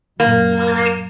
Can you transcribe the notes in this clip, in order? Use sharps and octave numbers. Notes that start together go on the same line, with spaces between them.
F#2 A#2 A#3